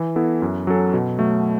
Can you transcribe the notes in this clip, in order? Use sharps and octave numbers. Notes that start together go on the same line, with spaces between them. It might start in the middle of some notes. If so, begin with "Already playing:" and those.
Already playing: E3
B3 E4 A4
F#2
F#3 C#4 A4
B2
F#3 A3